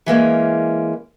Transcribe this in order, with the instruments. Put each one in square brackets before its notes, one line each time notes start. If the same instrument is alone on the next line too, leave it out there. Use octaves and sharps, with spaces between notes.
[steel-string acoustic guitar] E3 G#3 A#3 C#4